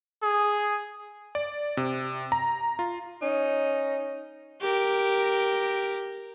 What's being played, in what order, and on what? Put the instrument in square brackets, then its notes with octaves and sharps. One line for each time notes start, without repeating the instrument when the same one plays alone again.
[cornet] G#4
[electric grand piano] D5
C3
A#5
F4
[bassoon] C#4 [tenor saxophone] D#4
[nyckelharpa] G4 A#4